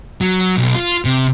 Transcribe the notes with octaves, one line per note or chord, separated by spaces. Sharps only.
F#3
B1
F4
C3